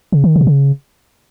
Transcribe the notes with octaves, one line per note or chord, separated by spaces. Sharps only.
C#3
D#3
C#3
B2
C#3